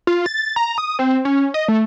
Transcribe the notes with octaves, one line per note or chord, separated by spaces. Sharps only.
F4
A6
A#5
D#6
C4
C#4
D#5
A3